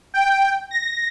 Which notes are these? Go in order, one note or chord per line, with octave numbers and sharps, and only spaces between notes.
G5
A#6